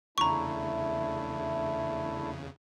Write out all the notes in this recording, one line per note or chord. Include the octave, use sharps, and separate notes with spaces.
E2 C#3 A3 D4 E4 A#5 C#6